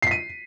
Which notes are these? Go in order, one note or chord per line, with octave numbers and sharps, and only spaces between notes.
B6 C7 D#7